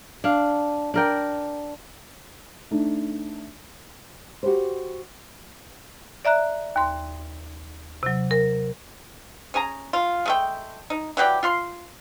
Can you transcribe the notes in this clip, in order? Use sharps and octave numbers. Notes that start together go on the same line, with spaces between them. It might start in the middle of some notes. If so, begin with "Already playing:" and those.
D4 F5
D4 A#4 G5
A3 D4 D#4
F#4 G4 B4 C5
D5 E5 A#5 F#6
D#2 C6
C3 F#3
A#4
C#4 G#4 G#5 A#5
F4
G#3 A3 G5
D#4
E3 F#3 G4 D5
F4 F5 C6